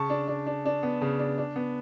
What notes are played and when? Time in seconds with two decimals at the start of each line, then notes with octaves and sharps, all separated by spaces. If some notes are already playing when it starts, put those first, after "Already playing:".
Already playing: C#3 A5 C#6
0.10 D4
0.28 D4
0.46 D4
0.65 D4
0.83 B3
1.01 C#3
1.19 D4
1.38 D4
1.56 B3